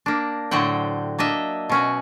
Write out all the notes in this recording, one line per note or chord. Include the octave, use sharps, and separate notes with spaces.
A#3 D4
A2 D3 F#3 C5 F#5 G5
A#3 D4 D#5 E5
B2 C#4 F#4